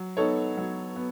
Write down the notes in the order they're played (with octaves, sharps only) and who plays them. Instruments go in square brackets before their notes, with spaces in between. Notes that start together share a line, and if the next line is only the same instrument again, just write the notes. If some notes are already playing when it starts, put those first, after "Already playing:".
Already playing: [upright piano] F#3
B3 D#4 A4 C#5
F#3
B3